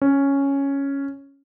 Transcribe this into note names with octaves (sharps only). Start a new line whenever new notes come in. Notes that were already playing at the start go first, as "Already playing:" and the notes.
C#4